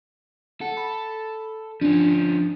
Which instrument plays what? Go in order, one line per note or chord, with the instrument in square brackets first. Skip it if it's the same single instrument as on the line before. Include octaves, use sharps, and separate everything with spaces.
[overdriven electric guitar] A4 [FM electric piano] F#5
[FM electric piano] B5
[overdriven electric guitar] F3 C#4 [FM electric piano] D4